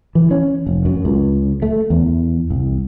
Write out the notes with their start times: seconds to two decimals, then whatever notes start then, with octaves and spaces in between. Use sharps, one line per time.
0.15 E3
0.31 C#4
0.67 F1
0.85 F#2
1.05 C#2
1.62 A3
1.90 E2
2.51 C2